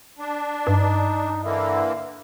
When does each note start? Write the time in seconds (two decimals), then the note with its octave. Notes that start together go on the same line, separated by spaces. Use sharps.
0.19 D4
0.67 G2 D#4
1.44 D3 E3 A#3 E4